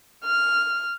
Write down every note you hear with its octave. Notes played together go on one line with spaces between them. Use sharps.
F6